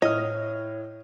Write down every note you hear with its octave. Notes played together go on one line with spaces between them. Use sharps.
A2 C#5 D#5 F6